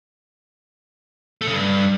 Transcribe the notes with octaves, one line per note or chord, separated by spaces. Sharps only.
A3
C#3
G2